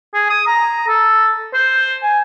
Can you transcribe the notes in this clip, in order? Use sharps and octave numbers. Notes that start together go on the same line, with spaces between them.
G#4
D#6
A#5
A4
C5
G#5